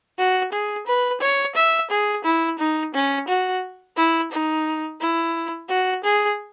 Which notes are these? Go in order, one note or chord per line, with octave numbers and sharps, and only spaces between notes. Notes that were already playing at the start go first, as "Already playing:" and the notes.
F#4
G#4
B4
C#5
E5
G#4
E4
D#4
C#4
F#4
E4
D#4
E4
F#4
G#4